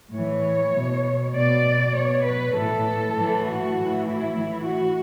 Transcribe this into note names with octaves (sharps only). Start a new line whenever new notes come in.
A2 E3 C#5
B2
B2 D5
B2 C#5
B4
A2 E3 A4
A2 E3
F#4
A2 E3
E4
A2 E3
F#4